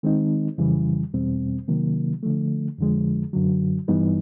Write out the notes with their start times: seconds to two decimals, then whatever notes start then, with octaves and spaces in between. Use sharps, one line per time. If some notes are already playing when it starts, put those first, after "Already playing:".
0.03 D#3 G#3 C4 D#4
0.58 F2 C#3 E3 G3
1.14 E2 B2 G3 C4
1.68 C3 D#3 F#3 A#3
2.23 D3 F3 A3
2.78 F2 D3 F3 G#3
3.33 F#2 D3 F#3
3.88 G2 E3 G3 B3 D#4